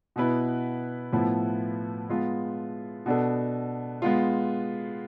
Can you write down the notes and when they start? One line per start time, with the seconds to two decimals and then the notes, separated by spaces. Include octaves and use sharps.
0.16 B2 B3 E4 B4
1.12 A2 F3 B3 E4 B4
2.09 G#3 B3 F4
3.06 B2 B3 D4 A4
4.02 G#3 B3 F4